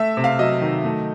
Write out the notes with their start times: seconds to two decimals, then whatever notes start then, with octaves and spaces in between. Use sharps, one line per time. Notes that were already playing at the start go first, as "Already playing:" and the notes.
Already playing: A3 E5
0.17 C3
0.24 F5
0.39 F#3 D#5
0.62 D#3
0.85 A3